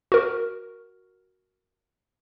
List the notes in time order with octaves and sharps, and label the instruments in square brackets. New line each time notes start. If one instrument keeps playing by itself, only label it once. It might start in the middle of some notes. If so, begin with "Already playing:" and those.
[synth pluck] F#4 A#4